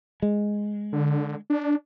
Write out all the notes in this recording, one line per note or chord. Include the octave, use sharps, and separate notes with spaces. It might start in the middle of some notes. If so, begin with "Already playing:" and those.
G#3
D3
D4